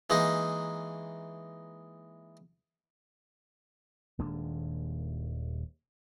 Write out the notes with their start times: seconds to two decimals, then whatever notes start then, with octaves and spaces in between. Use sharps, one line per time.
0.10 E3 G#3 A#3 D#4
4.19 D#1 D#2 G#3 D4